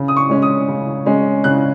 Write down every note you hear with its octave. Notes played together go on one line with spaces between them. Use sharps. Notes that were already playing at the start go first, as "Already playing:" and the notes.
Already playing: C#3
D#6
C#6
G#3 C#4
D#6
C#3
G#3 C#4
C#3 F#6